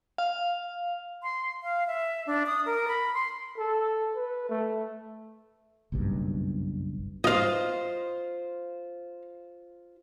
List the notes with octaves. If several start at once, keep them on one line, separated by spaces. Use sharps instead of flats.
F5
C6
F5
E5
D4
D#6
A#4
B5
C6
A4
B4
A3
F#1 B1 G2
F4 C5 D#5 F5